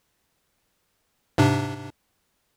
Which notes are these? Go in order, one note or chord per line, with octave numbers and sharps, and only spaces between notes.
G#2 C3 D4